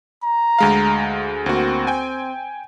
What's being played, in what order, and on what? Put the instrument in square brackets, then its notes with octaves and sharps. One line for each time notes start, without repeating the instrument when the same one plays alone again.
[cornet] A#5
[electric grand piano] D2 G#3 F5
[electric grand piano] D2 A#3 F#4 [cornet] C4
[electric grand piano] G5 G#5